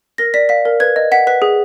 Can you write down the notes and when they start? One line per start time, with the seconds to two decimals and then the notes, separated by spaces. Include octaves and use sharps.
0.18 A#4 A#6
0.34 D5 B6
0.49 F5 B6
0.65 A#4
0.80 B4 G#6
0.96 D#5
1.12 F#5 B6
1.27 B4 B6
1.42 G#4